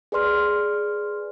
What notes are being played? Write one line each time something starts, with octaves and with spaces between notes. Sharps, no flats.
G#4 B4 D5 C6 F6